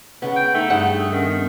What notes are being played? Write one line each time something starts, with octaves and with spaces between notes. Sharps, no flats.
C#3 B3 F#5
G5
A3 D#4
G2 G#4 F#5
D#3 C#4
B3